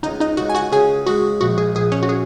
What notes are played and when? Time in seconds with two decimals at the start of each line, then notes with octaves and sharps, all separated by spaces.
0.03 C#2 D#4 D#5
0.20 D#4 D#5
0.37 C#2 F#4 F#5
0.50 G#5
0.55 F#4 F#5
0.72 C#3 G#4 G#5
1.06 G#3 F#4
1.41 A#1 F#4
1.58 G#4
1.75 A#1 G#4
1.92 C#4 C#5
2.03 F#4
2.09 G#4